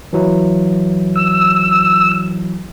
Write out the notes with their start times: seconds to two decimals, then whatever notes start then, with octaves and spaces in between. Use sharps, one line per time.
0.13 E3 F#3 E4
1.16 E6